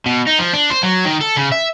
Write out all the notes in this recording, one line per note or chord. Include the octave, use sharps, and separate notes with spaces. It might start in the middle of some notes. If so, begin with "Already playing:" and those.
B2
D#4
F3
D4
C5
F#3
D#3
A4
C#3
E5